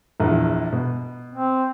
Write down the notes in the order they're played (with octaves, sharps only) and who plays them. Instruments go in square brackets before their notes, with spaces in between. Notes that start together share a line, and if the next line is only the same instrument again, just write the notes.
[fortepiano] A#1 E2
B2
[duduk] C4